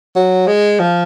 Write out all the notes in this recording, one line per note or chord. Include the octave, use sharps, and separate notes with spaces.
F#3
G#3
F3